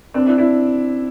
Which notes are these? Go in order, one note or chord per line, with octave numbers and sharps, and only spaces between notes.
C4 D4
D4 E4
D4 E4